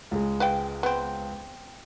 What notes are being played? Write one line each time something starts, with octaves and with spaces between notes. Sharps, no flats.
C#2 G#3
B4 F5 G5
B3 C4